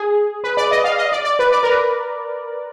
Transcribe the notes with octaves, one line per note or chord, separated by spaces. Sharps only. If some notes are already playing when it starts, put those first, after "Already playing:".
Already playing: G#4
B4
D5
D#5
F5
D#5
D5
D5
B4
D5
A#4
B4